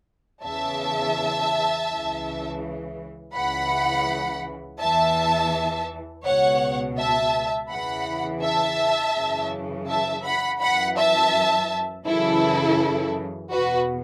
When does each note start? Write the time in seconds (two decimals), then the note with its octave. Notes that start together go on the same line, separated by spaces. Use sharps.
0.43 E2 C#3 E3 E5 A5
1.89 C#2 C#3 E3
3.33 C#2 C#3 E3 F#5 B5
4.79 E2 E3 E5 A5
6.24 C#2 B2 C#5 F#5
6.97 E5 A5
7.70 E2 C#3 E3 F#5 B5
8.42 E5 A5
9.16 F#2 C#3 E3
9.88 E5 A5
10.24 F#5 B5
10.60 F#2 E3 F#5 B5
10.97 E5 A5
12.06 F#2 C#3 E3 E4 A4
13.51 E2 B2 F#4 B4